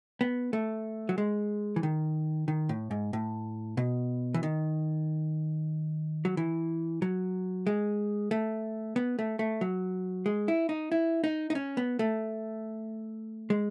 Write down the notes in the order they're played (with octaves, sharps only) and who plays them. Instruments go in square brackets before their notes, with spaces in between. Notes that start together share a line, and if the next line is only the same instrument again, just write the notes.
[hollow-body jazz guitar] B3
A3
F#3
G#3
E3
D#3
D#3
A2
G#2
A2
B2
E3
D#3
F#3
E3
F#3
G#3
A3
B3
A3
A3
F#3
G#3
E4
D#4
E4
D#4
D#4
C#4
B3
A3
G#3